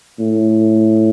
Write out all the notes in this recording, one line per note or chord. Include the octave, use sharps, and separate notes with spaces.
A2